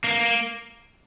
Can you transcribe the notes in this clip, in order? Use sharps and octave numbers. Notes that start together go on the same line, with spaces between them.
A#3